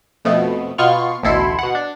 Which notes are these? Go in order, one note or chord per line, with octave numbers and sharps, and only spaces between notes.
F2 B2 A3 B3
B2 B3 F4 C6 C#6 F6
A1 D2 B2 E4 A4 C6
B2 F#5
D4